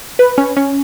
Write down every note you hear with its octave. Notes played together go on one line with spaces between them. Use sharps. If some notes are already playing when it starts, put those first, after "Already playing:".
B4
C#4
C#4